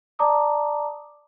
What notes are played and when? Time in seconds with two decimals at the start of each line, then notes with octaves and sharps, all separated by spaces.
0.19 D5 A5 A#5 D6 D#6